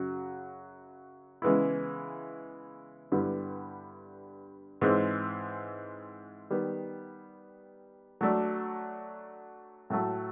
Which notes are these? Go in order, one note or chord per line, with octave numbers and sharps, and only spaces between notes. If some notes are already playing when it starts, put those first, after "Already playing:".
Already playing: F#2 C#3 F#3
C#3 E3 G#3 B3 E4
G2 D3 G3 B3 E4
G#2 E3 G#3 C4
D#3 G3 B3
F#3 A3 D4
A2 F#3 A3